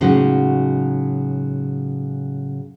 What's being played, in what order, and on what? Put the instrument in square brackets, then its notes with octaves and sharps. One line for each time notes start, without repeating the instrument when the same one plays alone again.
[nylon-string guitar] A2 C#3 F#3 G#3 D#4 F#4